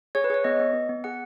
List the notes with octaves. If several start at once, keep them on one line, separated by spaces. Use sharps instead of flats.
G#4 C#5
B4
G#4 C#5
B3 D#5
B3
B3
B3
G#4 F#5